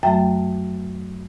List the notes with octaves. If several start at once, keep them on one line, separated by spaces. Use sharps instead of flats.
F#2 F#3 A3 E5 G5